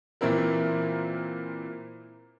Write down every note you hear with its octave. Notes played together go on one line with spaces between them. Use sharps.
A#2 E3 A#3 C4 E4 A#4